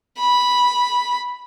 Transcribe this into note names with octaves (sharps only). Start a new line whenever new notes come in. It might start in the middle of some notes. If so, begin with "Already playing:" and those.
B5